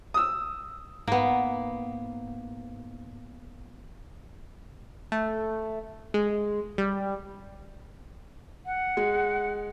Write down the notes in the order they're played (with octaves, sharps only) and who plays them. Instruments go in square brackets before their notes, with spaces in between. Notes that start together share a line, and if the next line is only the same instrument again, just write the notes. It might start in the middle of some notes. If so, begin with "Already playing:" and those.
[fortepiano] D#6 E6
[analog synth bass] G#2 [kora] A#3 B3
[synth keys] A3
G#3
G3
[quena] F#5
[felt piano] G#3